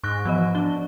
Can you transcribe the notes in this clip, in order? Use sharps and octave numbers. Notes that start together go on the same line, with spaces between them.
G#2 C#6 F#6 A#6
E3 F3 B3 D#5
D4 G7